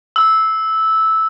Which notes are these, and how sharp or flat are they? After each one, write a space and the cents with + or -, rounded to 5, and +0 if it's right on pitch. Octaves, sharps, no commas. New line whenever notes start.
E6 -10